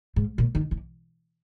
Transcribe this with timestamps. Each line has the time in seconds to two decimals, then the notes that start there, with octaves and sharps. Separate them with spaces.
0.16 G#2
0.38 A#2
0.55 D#3
0.71 E3